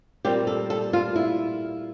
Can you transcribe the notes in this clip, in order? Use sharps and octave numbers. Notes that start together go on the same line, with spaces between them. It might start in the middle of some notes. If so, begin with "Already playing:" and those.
A#2 G3 C4 G4
A4
A4
F4
E4